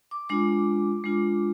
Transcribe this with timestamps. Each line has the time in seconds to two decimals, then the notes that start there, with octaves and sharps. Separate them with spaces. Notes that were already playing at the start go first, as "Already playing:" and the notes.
0.11 D6
0.29 G#3 D4 F4 D6
1.04 G#3 D4 F4